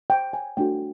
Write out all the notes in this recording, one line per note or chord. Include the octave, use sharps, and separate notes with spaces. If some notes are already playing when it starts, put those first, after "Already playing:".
G5
G#5
A3 D4 F#4 G5